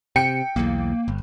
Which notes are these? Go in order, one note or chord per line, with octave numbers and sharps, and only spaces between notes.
C3 G5 C#7
B1 E2 A#3
G1